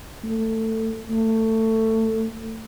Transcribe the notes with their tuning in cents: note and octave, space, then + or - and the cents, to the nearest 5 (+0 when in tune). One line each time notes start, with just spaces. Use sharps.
A3 +20
A3 +20